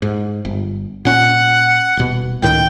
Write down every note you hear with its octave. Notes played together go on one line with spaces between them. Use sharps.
G#2
G1
A#2 C#4 F#5
D#1 B2
C#2 A2 D#3 G5